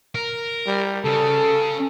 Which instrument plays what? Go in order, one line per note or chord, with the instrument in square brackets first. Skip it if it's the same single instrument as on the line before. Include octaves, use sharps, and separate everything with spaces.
[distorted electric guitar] A#4
[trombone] G3
[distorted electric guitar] C#3 [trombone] A4